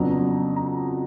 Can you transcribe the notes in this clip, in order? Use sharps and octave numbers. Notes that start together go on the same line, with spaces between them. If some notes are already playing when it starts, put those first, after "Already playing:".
Already playing: F2 C#3 F#3 B3 D4 A#5
A#5